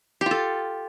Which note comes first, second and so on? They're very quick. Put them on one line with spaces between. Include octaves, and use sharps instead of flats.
G4 F4 A4